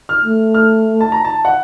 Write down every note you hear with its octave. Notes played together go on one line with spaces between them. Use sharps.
F6
A3
F6
A5
A#5
A5
F#5